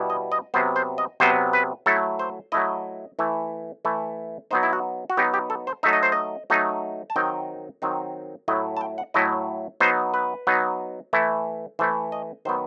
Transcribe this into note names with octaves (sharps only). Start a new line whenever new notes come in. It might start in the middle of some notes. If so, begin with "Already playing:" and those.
Already playing: B2 G3 B3 E4
D#5
D#5
C3 F#3 B3 C5
C5
D#5
C3 F#3 B3 C5
B4
F#3 A3 E4 A4
C5
F#3 A3 E4 D#5
E3 A3 E4
E3 A3 E4
F#3 B3 D#4 C5
E4
F#4
F#4
F#3 B3 D#4 G4
G4
A4
C5
F#3 A3 D#4 E5
D#5
C5
D#5
F#3 A3 D#4
A5
D#3 F#3 C4 D#4 G5
D#3 F#3 C4 D#4
A2 F#3 A3 E4 D#5
A5
G5
F#5
A2 F#3 A3 E4 D#5
F#3 B3 D#4 C5
B4
F#3 B3 D#4
E3 A3 E4
E3 A3 E4 C5
D#5
D#3 F#3 B3 C5